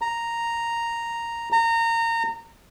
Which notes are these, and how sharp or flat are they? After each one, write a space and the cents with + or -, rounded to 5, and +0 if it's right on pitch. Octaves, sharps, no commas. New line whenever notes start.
A#5 -5
A#5 -25